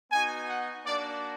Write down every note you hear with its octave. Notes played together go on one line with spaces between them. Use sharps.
B3 D#4 F#4 G#5
F#5
A#3 D4 F#4 D5